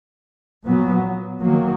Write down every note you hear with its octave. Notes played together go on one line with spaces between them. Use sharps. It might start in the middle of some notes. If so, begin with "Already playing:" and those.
A#2 F#3 B3
D#3 F#3 A#3